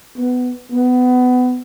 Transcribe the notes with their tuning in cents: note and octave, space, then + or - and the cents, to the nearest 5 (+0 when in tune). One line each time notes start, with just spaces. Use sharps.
B3 +15
B3 +20